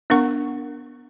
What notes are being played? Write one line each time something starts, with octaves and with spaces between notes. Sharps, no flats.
B3 D4 A#4 F#5 C#6